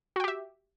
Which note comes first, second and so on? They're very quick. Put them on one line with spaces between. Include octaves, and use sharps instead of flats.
F#4 G5 G4 E5